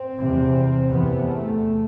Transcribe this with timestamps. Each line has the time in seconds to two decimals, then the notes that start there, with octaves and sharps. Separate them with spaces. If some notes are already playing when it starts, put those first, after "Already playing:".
Already playing: C4
0.20 E2 C3
0.91 E2 C3 B3
1.27 A3